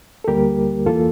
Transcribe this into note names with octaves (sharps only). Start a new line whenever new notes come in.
A4
D2 D3 G3 A#3 G4 A#4
E2 E3 A#3 F4 A4